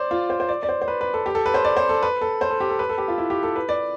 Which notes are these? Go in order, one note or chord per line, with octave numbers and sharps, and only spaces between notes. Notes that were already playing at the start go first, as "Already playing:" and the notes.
Already playing: C5 D5
F4
C5
C5
D5
D5
C5
C5
B4
B4
A4
G4
A4
B4
C5
D5
C5
A4
B4
A4
C5
A4
G4
A4
B4
A4
G4
F4
E4
G4
A4
B4
D5